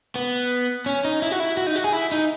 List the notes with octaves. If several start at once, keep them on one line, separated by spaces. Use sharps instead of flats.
B3
C#4
D#4
E4
F#4
E4
F#4
D#4
F#4
G#4
E4
D#4